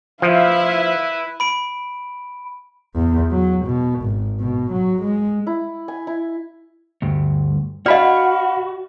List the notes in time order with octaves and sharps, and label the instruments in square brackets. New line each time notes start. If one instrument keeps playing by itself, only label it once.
[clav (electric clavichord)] F3 [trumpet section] E4 B4 [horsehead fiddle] E5 F5
[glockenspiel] B5 D7
[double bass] E2
F#3
B2
G#1
B2
F#3
G#3
[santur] E4
G#5
E4
[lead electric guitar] D2 G2
[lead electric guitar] F#4 [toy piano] D5 D#5 [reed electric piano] F5 B5 F6 [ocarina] F#5